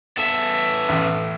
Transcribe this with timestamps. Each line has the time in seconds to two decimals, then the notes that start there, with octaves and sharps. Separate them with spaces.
0.17 B3 A4 E5
0.89 A1